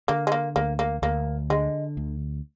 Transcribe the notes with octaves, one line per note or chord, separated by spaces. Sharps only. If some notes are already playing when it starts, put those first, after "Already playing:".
D3 A#3
G#3
A#3
D2 A#3
A#3
D2 A#3
D3 G#3
D2